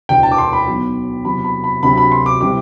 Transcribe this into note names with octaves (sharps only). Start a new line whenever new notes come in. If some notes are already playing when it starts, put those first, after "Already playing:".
E1 D2 D3 G5
A5
D6
C6
B5
B1 B2 F#3
E2 C3 F#3 B5
B5
B5
D2 C3 F#3 B5
B5
C6
D6
C3 E3 G3 D6